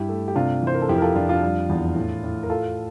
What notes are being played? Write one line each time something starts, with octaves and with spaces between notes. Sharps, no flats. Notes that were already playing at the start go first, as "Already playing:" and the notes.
Already playing: G2 E4 G4
A3
G4
C3 D4 F4
E3 C5
A#4
A4
F2 E4 G4
A#4
F4 A4
F2 D4 F4
D4 F4
G3
E2
A2
A2
A#4
A3 F4 A4